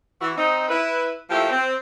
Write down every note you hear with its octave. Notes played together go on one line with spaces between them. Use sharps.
E3 F#4
C4 D#4
E4 B4
F3 A3 A#3 E4 G4
C4